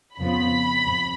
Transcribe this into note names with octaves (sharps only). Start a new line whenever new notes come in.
F2 C#3 F3 B3 B5
F2